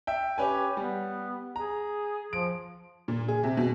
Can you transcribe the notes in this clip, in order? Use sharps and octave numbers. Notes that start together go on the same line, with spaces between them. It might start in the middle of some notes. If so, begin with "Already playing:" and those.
E5 G5
C#4 G4 B4 G#5
G3 B3
G#4 A#5
F3 D7
A#2
G#4
C3
B2